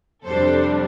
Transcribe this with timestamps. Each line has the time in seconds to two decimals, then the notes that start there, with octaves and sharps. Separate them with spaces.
0.24 F2 C3 G3 D4 A4 C5